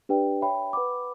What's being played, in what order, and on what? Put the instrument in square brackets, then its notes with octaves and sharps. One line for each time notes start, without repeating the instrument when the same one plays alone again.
[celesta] D4 G4 B4 D5 G5
C#5 E5 G5 B5
B4 F#5 B5 D6